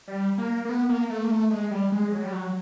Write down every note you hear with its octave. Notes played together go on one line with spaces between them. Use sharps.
G3
A#3
A#3
B3
A#3
A3
A#3
A3
G#3
G3
G#3
F#3
G3
F#3